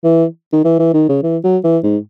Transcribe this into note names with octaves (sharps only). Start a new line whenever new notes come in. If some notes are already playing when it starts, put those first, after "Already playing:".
E3
D#3
E3
E3
D#3
C#3
E3
F#3
E3
G#2